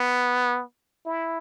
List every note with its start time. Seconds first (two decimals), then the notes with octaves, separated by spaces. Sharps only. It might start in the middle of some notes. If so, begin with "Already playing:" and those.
Already playing: B3
1.06 E4